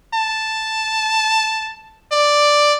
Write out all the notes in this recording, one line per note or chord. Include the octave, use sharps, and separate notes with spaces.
A5
D5